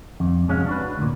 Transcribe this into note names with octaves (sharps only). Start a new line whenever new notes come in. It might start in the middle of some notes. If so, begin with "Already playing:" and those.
F2
C2 F2 G#3 C#4 F#4 F5
D4 F#4 B4
D2 A#2